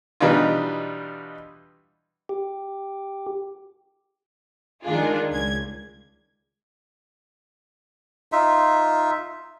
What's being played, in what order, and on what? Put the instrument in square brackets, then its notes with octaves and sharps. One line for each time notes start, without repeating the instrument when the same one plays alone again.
[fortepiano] B2 E3 G3 D4 D#4 F4
[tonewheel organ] G4
[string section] D#3 G#3 D4 F4 G#4
C#2 G#6
[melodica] D#4 F4 E5